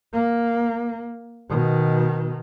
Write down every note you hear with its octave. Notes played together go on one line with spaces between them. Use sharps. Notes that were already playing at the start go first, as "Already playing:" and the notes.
A#3
B2 D#3